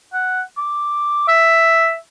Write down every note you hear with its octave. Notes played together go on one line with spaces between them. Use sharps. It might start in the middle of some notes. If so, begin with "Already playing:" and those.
F#5
D6
E5